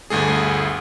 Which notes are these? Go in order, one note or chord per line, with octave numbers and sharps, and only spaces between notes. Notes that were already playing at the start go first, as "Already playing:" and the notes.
G1 D2 A3 G#4